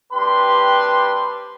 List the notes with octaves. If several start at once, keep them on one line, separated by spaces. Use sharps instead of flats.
G3 C4 D4 G4 B4 C6